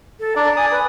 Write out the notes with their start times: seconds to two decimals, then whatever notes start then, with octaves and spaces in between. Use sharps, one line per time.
0.20 A4
0.36 D4 D5 A#5
0.56 D5 G#5 D#6
0.71 B4